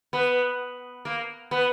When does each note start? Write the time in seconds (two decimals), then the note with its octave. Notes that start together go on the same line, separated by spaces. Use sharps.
0.13 B3
1.05 A#3
1.51 B3